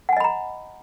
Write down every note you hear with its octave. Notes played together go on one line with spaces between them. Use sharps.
D#5 F#5 G#5 A#5 B5